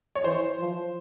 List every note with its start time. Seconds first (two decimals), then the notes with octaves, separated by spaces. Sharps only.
0.15 C#5
0.24 E3 C5
0.60 F3